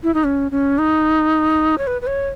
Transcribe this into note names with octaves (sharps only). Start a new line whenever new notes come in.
E4
D#4
C#4
C#4
D#4
C#5
B4
B4
C#5